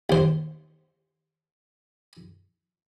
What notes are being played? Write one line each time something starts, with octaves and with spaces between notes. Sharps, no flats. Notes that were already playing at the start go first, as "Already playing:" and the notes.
D#2 C5